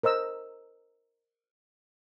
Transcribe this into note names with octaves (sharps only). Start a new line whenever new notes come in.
A#4 C5 D#5 E6